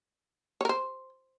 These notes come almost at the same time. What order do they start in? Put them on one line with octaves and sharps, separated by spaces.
C#5 A#4 C5